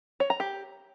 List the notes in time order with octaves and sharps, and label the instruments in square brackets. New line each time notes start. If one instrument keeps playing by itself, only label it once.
[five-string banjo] C#5
A#5
G4